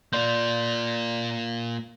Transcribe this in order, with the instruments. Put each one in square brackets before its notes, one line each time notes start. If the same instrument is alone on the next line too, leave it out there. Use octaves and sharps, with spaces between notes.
[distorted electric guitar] A#3 F4 [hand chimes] D5 C6 G6